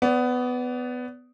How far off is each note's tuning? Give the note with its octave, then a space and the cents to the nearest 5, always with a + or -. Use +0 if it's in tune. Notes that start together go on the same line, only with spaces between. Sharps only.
B3 +15 D5 -30